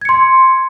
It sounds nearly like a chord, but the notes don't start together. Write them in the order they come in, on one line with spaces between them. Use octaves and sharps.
G#6 C#7 C6